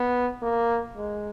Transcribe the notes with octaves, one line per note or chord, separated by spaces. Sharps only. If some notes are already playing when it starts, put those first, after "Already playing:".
Already playing: B3
A#3
G#3